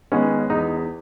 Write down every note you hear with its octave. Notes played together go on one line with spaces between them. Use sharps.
D#3 G#3 B3 C#4
E2 D#4